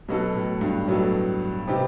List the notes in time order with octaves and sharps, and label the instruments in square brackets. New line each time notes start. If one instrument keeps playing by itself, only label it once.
[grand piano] B2 [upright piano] F#3 B3 D#4 F#4 A4
[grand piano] A2
G2
[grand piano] A2 [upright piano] F#3 B3 D#4 F#4 A4
[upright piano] C3 E3 B3 D#4 G4